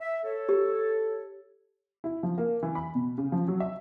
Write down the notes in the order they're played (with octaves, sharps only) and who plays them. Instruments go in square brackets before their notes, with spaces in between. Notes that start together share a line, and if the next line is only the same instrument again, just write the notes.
[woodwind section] E5
A4 C#5
[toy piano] G4
[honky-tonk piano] E4
F3
A#3
E3
B5
B2
C#3
F3
F#3
E5